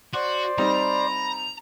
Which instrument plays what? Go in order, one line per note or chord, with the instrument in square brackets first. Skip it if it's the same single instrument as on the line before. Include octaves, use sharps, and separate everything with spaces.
[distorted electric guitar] F#4 [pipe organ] C5 D5
[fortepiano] G3 C4 D#4 [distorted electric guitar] A#5 [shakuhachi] B5